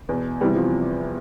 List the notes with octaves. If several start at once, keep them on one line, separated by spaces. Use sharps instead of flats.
E2 B2
E2 C3 E3 G3
F3